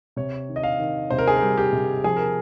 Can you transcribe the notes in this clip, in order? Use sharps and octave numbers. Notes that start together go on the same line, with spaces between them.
C3 C#5
D#3
D#5
F5
D#3
C3 C5
A#4
G#4
A#4
G3
G4
C3
F3 G#4
A#4